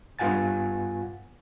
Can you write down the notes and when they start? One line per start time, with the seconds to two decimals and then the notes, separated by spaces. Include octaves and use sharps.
0.19 G2 B3 F4 F#5 G#5 A6